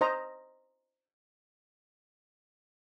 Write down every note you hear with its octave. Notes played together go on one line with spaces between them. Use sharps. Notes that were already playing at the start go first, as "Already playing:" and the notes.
C5 D#5 A#5